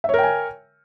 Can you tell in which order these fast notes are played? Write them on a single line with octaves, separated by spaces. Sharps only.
E5 C#5 A#4 G5 G#5